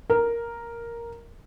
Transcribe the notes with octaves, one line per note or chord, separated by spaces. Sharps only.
A#4